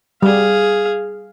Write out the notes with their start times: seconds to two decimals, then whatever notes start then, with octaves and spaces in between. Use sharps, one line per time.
0.22 G3 G#4 F5